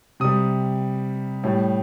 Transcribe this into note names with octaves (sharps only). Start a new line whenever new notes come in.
C3 G3 D#6
A2 G3